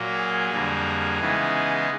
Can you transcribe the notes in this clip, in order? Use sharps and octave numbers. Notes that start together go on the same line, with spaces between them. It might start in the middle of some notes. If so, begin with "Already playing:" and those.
Already playing: A#2 F#3 A#3
G#4
F2 D3 G3 A#3
C#3 E3 G#3 B3 D#4